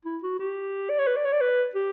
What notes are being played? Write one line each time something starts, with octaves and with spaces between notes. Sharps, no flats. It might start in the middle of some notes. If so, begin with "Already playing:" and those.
E4
F#4
G4
D5
C#5
B4
D5
C#5
D5
B4
G4